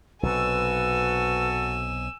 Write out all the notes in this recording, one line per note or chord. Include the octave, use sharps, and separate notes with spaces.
B1 C3 F#4 A4 B4 G#5 E6